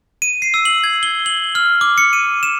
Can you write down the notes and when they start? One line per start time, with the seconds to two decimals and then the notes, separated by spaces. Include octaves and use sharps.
0.22 D#7
0.42 C7
0.54 E6
0.65 F#7
0.84 G#6
1.03 G7
1.26 F#7
1.55 F6
1.81 D6
1.98 C#7
2.13 D#7
2.43 E7